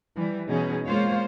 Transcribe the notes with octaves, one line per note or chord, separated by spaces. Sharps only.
E3 G3
B2 E3 C#4 D#4 G#4
G#3 A#3 F4 C5 C#5 F5